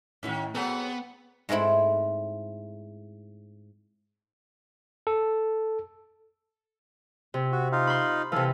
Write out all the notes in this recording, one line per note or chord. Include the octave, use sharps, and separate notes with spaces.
A2 D#3 C#4 E4 F#4
F#3 B3 C4 G#4 A4 F#5
G#2 G#3 A3 C4 E4
A4
C3
F#4
D#4 F4 F5
B5 C6
C3 E3 A4 F5